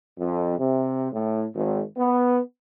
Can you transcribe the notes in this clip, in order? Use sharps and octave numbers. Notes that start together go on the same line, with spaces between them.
F2
C3
A2
G#1
B3